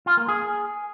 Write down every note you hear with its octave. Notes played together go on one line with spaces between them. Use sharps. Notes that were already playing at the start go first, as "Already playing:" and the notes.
F4
A#3
G#4